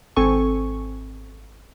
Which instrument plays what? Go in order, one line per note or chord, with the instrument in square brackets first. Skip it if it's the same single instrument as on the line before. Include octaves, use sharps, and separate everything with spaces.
[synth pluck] G#1 C4 A4 G#5 C#6